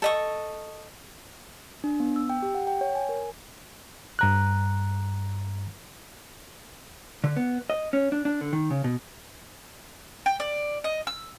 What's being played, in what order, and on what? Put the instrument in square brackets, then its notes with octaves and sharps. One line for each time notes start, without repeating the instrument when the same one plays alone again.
[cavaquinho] A4 D#5 C#6
[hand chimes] D4
B3
E6
G5
G4
F#5
G5
C#5
G#5
A#4
[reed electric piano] G2 A#5 F#6
[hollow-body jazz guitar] D3
B3
D#5
C#4
D4
D4
D3
D#3
C#3
B2
[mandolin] G5
D5
D#5
E6